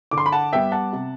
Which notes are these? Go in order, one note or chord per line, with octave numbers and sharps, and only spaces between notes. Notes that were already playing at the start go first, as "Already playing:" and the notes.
D3 D6
C6
B5
F#5 A5
G3 B3 E5 G5
F#5 A5
C3